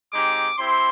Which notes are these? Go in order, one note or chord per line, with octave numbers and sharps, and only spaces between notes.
G#3 C4 D#4 G4 D6
C4 E4 G4 C6